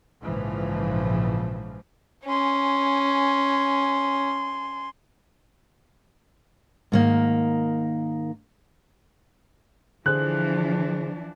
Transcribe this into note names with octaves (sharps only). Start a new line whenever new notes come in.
A#1 G#2 C#3 E3 F3
C#4 G#5 C6
G#2 D#3 A#3
D3 E3 F3 D4 G#4 C5 F#6